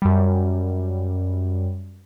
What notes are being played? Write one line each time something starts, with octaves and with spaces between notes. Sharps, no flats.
F#2 G3